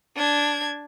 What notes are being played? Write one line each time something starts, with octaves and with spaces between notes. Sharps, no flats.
D4 G#6